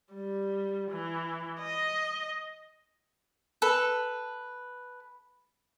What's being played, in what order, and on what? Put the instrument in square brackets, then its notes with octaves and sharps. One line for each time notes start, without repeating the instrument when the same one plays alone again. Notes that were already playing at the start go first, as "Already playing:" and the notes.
[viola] G3
E3
D#5
[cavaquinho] A4 B4